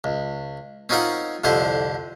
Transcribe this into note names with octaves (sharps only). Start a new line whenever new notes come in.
C#2
C4 C#4 D#4 F4 A#4 F#5
C2 F2 D3 E4 C5